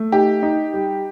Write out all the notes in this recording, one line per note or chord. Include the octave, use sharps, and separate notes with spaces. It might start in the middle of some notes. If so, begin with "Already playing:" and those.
Already playing: A3
D#4 G4
D#4
G3